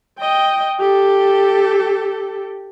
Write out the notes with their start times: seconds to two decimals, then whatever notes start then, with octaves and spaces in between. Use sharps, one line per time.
0.19 D#5 G5
0.79 G4 A4